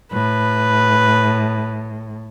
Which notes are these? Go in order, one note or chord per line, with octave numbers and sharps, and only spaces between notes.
A2 B4